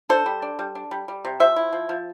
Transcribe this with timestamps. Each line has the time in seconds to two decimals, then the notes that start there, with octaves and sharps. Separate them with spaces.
0.09 D4 A4 C5
0.26 G3
0.42 D4
0.59 G3
0.75 D4
0.91 G3
1.08 G3
1.25 C3
1.40 F3 C5 E5
1.56 E4
1.72 F3
1.89 F3